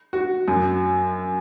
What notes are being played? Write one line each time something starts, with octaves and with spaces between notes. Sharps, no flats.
F#4
F#2